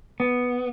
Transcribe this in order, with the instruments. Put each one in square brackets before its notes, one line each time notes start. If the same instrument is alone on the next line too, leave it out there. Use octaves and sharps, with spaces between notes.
[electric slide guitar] B3